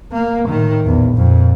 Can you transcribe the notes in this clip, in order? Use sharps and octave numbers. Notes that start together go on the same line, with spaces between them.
A#3
A2 D#3
A#1 E2
F2 A#2